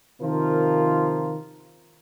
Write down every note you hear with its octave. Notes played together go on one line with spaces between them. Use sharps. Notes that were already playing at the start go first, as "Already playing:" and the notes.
C3 D#3 F3 F4 A#4